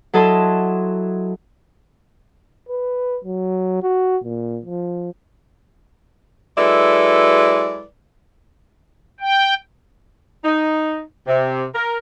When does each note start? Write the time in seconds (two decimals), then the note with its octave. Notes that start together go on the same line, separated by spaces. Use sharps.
0.13 F#3 E4 A4 D#5 A5 C6
2.69 B4
3.24 F#3
3.83 F#4
4.24 A#2
4.66 F3
6.58 F#3 G#3 E4 A4 B4 D5
9.20 G5
10.44 D#4
11.27 C3
11.75 A#4